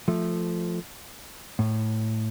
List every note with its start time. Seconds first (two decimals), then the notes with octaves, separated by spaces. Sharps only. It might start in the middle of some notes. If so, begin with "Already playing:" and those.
0.08 F3 A3
1.59 A2